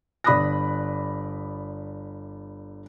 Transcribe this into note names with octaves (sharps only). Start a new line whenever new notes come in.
G1 D5 B5 D#6 F#6 A#6